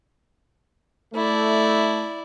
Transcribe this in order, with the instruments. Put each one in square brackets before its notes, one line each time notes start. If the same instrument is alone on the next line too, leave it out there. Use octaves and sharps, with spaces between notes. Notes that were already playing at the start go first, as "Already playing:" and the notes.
[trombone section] A3 [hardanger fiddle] E4 D5